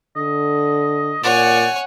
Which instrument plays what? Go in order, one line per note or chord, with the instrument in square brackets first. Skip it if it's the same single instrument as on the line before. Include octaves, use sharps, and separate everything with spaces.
[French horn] D3 [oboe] D#5
[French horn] A#2 [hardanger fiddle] C#5 G#5 [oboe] D5 [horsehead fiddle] F#5